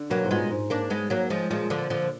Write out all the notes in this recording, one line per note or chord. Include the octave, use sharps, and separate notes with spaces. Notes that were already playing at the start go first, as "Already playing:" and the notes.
Already playing: D3
B2 F#3 A#3
G#2
A#2 G#3 B3
G#2
A#3 D4
G#3 B3
F#3 A#3
F3 G#3
A#2 F3 G#3
D3 F3
D3 F3